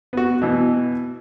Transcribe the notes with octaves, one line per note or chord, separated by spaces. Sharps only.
B3 F#4
B2 E3 B3